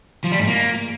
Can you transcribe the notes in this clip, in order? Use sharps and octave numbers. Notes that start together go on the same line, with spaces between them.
F3
G3
G#2
A#3